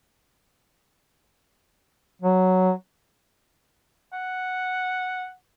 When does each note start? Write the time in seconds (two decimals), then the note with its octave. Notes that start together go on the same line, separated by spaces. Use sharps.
2.22 F#3
4.13 F#5